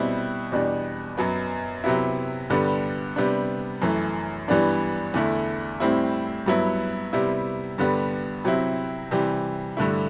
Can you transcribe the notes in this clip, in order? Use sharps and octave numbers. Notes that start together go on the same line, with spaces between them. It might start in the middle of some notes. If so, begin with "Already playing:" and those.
Already playing: B2 G3 C4 E4
E2 B2 G3 D4
F#2 F#3 B3
C3 F#3 B3 E4
G2 D3 G3 B3 D4
C3 G3 B3 D4
F#2 E3 A3
G2 E3 G3 B3 D4
E2 D3 A3 E4
A2 G3 C4 E4
G2 F#3 B3 E4
C3 G3 B3 E4
G2 D3 G3 B3
C3 F#3 C4 E4
C3 E3 G3
G2 D3 A3 E4